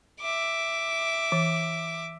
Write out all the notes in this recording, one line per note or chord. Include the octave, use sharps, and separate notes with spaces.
E5 D6
E3